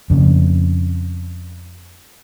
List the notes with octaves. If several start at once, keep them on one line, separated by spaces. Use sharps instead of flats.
F2 C#3